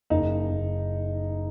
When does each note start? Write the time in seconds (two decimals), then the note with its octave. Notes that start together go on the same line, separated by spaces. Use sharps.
0.10 F#1 D#4
0.50 F#1